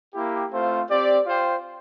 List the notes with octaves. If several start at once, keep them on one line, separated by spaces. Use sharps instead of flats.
A#3 E4 G4
A3 C4 F4 C5 F5
C4 G4 D5
F4 C5 G5